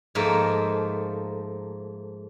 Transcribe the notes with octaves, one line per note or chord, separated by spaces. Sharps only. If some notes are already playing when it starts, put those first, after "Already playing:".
G#2 F3 A3 A#3